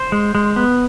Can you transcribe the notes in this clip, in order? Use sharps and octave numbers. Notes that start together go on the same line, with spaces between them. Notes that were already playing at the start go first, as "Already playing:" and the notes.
Already playing: C5
G#3
G#3
B3